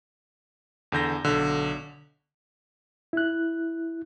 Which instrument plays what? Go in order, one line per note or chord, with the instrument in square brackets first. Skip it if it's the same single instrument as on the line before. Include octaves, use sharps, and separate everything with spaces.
[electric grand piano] E2 D3 G6 A#6
B1 D3
[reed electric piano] E4 F#6